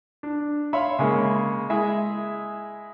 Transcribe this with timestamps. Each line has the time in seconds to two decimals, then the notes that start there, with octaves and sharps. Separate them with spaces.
0.23 D4
0.73 C#5 E5 F5 B5 C6
0.99 C#3 G#3 A#3
1.70 G#3 E4 G#4 E5